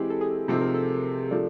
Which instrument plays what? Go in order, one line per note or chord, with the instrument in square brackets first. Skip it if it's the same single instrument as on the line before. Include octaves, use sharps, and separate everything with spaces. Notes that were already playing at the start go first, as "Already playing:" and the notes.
Already playing: [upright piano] E3 G#3 C4 E4 [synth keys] G4
[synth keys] A4
G#4
[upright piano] C3 F3 A3 C4 D#4 [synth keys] A4
[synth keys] A#4
A4
[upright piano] F3 A3 D4